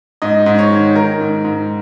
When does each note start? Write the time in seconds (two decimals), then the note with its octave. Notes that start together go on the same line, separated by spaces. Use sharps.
0.22 G#2 D#5
0.46 G#2
0.59 C#5
0.71 D#3
0.95 D#3 A#4
1.20 G#2
1.45 G#2